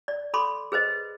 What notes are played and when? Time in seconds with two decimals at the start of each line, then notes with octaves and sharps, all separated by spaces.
0.08 D5
0.34 A4 B5 C6 D6
0.72 G#4 B4 C5 D#5